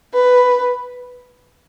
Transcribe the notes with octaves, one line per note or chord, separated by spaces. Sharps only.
B4